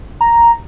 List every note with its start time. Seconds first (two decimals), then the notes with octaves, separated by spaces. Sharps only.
0.21 A#5